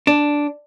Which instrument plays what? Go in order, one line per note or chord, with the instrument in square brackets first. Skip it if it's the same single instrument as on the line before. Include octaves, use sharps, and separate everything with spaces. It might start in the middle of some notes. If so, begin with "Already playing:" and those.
[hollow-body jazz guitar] D4